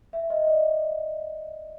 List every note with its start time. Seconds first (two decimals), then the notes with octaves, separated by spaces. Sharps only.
0.13 E5
0.30 D#5
0.47 D5